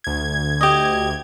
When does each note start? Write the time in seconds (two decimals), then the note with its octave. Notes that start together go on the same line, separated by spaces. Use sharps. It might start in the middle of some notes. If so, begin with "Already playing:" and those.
0.04 D2 G#6
0.61 G4 D#5